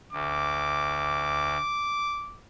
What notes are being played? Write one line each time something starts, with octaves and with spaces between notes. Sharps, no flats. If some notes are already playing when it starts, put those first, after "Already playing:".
D2 D6